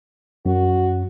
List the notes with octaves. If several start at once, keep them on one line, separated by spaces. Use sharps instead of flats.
F#2 F#4